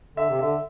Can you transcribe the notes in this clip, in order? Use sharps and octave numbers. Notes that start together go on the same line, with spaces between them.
D3 E5
C3
D3 E5